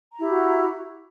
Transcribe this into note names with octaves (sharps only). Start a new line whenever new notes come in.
E4 F#4 G4 A#5